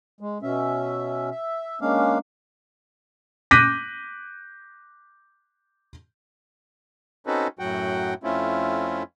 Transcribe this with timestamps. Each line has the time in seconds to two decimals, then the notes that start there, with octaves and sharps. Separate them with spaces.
0.21 G#3
0.42 B2 C#4 E5
1.31 E5
1.81 G#3 A#3 C#4 D4 F5
3.51 D6 F#6 G6 A#6 B6 D#7
7.27 C4 C#4 D#4 F#4 A4 B4
7.59 F#2 A2 F#3 F#4 F#5 G5
8.24 F2 A3 C4 C#4 E4 F4